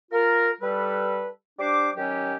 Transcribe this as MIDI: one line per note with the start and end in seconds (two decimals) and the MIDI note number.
0.12 0.51 65
0.12 0.51 70
0.61 1.28 55
0.61 1.28 69
0.61 1.28 71
1.59 1.90 55
1.59 1.90 62
1.59 1.90 72
1.59 1.90 86
1.96 2.36 51
1.96 2.36 54
1.96 2.36 61
1.96 2.36 67